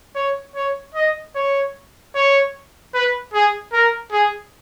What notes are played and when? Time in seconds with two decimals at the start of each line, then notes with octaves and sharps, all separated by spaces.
0.15 C#5
0.55 C#5
0.95 D#5
1.35 C#5
2.15 C#5
2.94 B4
3.33 G#4
3.73 A#4
4.12 G#4